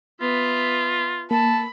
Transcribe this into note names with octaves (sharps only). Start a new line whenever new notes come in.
B3 F4 E5
A#3 A5 B5